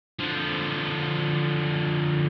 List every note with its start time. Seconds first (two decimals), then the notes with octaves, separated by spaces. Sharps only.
0.19 D3 F3